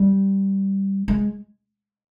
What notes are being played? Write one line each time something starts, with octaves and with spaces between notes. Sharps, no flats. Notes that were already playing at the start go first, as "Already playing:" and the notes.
Already playing: G3
G#3